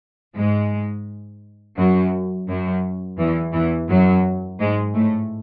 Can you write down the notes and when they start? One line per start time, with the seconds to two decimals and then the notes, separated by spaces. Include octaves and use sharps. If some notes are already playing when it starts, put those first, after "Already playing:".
0.36 G#2 G#3
1.77 F#2 F#3
2.47 F#2 F#3
3.18 E2 E3
3.53 E2 E3
3.89 F#2 F#3
4.59 G#2 G#3
4.94 A2 A3